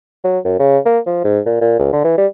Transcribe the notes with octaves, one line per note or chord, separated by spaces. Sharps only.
F#3
F#2
C#3
A#3
F3
G#2
A#2
A#2
C#2
D3
E3
G3